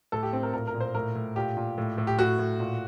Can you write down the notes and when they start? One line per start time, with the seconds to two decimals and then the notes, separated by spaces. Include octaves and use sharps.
0.12 A2 A4
0.23 G4
0.33 A2 C4
0.43 A#4
0.53 A#2 A#4
0.67 A#4
0.74 A#2
0.81 C5
0.95 A2 A#4
1.15 A2
1.36 A#2 G4
1.57 A#2
1.78 A2
1.98 A2
2.07 G4
2.19 A2 F#4
2.39 A2
2.60 A#2